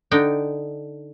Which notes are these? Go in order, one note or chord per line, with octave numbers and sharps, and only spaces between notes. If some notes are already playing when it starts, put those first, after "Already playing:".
D3 D4 D#4 G5